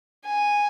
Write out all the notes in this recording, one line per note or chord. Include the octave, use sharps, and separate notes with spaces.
G#5